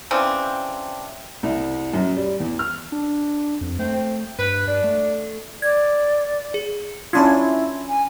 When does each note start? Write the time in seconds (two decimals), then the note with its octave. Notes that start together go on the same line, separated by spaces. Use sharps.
0.11 C#3 E3 C4 D4
1.43 C2
1.94 F#2
2.17 G3
2.40 E2
2.59 F6
2.92 D4
3.61 F2
3.79 A3 C4
4.39 G2 B4
4.67 G2 D4
4.84 A3
5.62 D5 G#6
6.54 G#4
7.13 C#4 D4 E4 F4 B5 C6 G#6
7.89 G#5